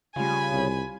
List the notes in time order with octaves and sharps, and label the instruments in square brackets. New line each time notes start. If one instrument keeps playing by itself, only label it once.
[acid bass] C#3 [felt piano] G3 F4 [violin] G#5 B5
[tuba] C2